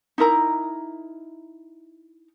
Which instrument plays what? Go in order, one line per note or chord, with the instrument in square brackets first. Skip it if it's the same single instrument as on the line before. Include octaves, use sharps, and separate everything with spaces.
[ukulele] D#4 E4 A#4 A#5